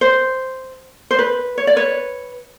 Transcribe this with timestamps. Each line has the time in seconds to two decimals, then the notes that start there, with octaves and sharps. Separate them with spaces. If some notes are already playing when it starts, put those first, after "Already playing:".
0.01 C5
1.11 C5
1.19 B4
1.58 C#5
1.67 D5
1.76 B4 C#5